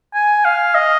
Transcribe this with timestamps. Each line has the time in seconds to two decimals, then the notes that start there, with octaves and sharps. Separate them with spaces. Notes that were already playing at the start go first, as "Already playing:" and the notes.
0.15 G#5
0.45 F5
0.75 D#5